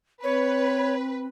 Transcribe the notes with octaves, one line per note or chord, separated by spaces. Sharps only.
C4 B4 C#5